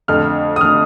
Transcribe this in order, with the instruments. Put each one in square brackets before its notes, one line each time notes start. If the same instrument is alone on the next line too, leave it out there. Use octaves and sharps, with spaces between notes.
[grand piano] F2 D3 A3 F6
D#6
D3 A3 F6